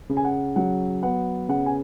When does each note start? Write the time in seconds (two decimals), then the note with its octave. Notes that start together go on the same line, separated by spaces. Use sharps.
0.09 C#3
0.17 G#5
0.25 F#5
0.56 F#3 F#5
1.02 B3 F#5
1.49 C#3 F#5
1.66 G#5